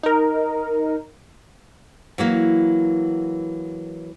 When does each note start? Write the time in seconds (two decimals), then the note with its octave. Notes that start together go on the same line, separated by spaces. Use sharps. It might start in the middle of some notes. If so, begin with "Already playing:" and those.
0.03 D#4 A#4
2.18 E3 F#3 A#3